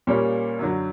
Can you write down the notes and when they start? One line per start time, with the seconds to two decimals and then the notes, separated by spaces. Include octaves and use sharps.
0.07 A#2 G3 A#3 C#4
0.59 F#2 D3 F#3